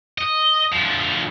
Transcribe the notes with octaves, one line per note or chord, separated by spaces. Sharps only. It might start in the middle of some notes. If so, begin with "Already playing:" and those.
D#5
D2 F3